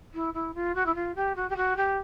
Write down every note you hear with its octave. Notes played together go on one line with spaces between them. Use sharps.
E4
E4
F4
F#4
E4
F4
G4
F#4
G4
F#4
G4